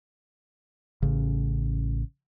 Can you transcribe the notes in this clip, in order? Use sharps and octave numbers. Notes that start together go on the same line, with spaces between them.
A1 C#3